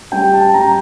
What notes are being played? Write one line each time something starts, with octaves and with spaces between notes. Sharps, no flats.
G3 G5
A5
G3 A#5